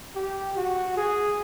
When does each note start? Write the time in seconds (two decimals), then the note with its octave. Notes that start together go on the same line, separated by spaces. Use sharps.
0.15 G4
0.57 F#4
0.97 G#4